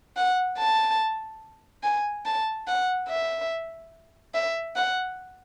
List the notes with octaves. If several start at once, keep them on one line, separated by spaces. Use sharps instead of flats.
F#5
A5
G#5
A5
F#5
E5
E5
F#5